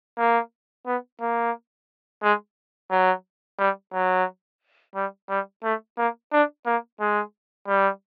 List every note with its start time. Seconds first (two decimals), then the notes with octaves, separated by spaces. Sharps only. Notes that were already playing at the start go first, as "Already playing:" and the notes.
0.18 A#3
0.86 B3
1.20 A#3
2.23 G#3
2.91 F#3
3.59 G3
3.93 F#3
4.95 G3
5.29 G3
5.64 A3
5.97 A#3
6.32 D4
6.66 A#3
7.00 G#3
7.68 G3